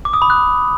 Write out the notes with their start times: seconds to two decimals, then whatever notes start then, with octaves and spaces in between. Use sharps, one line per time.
0.05 D6
0.13 D#6
0.22 B5
0.30 F#6